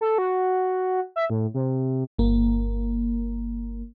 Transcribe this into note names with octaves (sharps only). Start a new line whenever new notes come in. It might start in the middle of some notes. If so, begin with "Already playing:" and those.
A4
F#4
E5
A2
C3
G1 A#3